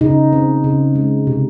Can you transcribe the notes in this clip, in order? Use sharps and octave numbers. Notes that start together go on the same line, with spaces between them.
C#3 D#4
C4
C#3
G#3
C3